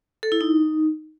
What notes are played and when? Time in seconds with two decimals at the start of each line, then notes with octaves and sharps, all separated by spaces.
0.23 A4
0.32 E4
0.41 D#4